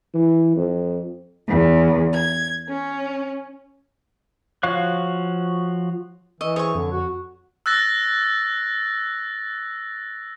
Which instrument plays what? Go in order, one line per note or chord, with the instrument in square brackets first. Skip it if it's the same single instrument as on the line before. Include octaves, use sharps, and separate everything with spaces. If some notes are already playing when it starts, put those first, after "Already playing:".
[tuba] E3
F2
[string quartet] E2
G#6
C#4
[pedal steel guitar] F3 F#4 C#5 F5 F#6
[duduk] E3 [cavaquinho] D#5 [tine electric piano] C#6 E6
[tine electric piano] G#4 C5 D#6 [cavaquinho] C#5 C#6
[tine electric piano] F2 [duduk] D3
[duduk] F#4
[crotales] E6 F#6 A6 A#6